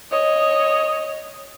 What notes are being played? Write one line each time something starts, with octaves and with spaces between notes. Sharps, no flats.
C#5 D#5